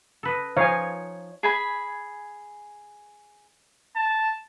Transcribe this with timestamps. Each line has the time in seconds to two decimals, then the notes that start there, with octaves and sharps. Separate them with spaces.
0.23 A4 B4 D#5
0.57 F3 D#4 C#5 F5 G#5
1.43 G#4 G#5 B5
3.96 A5